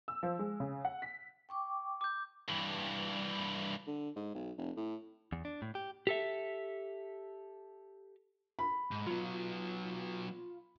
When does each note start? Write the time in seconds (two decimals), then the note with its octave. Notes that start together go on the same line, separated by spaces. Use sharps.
0.08 E6
0.23 F3
0.39 G#3
0.60 C#3
0.85 F#5
1.02 B6
1.49 G5 C#6 D6
2.01 D6 G6
2.49 G2 E3
3.87 D3
4.16 G#2
4.35 B1
4.58 F1
4.77 A2
5.32 E2
5.45 D4
5.62 A2
5.75 G4
6.07 G4 A4 E5
8.59 B5
8.91 G#2
9.07 F#3 B3 F4